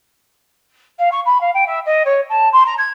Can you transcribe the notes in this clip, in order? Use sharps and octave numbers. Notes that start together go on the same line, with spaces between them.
F5
C#6
B5
F5
G5
E5
D#5
C#5
A5
C6
A#5
G#6